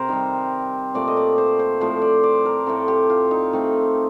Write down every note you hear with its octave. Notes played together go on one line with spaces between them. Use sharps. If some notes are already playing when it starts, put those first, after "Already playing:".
Already playing: C3 A#4 C5
D#3 G3 C4
A#2 A3 C4 D5
D#5
D5
C5
C5
A2 F3 A3 C4 C5
D5
D5
A#4
A2 A3 C4 A4
G4
F4
D#4
D#3 A3 C4